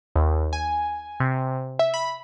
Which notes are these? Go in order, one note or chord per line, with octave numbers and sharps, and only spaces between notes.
D#2
G#5
C3
E5
B5